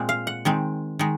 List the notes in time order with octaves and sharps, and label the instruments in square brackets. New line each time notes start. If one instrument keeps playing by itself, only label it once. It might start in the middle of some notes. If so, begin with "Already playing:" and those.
Already playing: [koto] A#2 G#3 C4
F5
F#5
D#3 G#3 C4
D#3 G#3